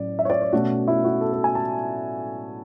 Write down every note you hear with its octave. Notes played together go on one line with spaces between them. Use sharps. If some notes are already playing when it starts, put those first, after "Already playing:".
Already playing: A2 F#3 C#4 D5
E5
C#5
D5
C#5
B2 A3 C#4 F#4
E4
F#4
A4
A4
G#5
A5